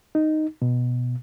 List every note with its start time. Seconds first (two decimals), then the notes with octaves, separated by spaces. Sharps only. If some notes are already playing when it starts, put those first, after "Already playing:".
0.15 D#4
0.62 B2